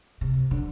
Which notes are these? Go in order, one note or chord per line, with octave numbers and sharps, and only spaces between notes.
C3
D3